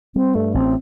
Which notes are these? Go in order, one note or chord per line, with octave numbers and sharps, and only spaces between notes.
G3 C4
G2 A3
A1 C4